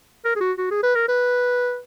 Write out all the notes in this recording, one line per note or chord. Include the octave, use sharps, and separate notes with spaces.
A#4
G#4
F#4
F#4
G#4
B4
A#4
B4